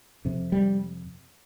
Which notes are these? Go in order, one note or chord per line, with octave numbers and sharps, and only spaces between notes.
F2 C3
G3